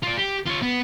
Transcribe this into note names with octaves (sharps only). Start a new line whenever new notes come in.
F4 D5
G4
F4 C#5
B3